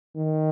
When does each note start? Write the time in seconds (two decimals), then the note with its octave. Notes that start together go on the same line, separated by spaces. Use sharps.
0.16 D#3